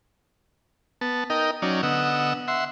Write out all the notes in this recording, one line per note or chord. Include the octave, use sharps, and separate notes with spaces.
B3 A5
D#4 A#4 D#5 G5
F#3 C#4 D#4 D5
D3 B3 D#5 F#5 E6
E5 F#5 C6